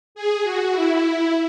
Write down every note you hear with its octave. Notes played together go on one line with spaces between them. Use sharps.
G#4
F#4
E4